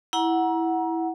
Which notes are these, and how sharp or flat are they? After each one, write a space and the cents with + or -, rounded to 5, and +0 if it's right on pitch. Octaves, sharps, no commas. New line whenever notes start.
E4 -5 F#5 +0 A#5 +30